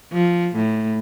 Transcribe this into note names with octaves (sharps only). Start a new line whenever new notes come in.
F3
A2